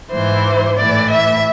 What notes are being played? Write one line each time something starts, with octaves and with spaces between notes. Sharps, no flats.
G#2 E3 C5
A2 E3 D5
E5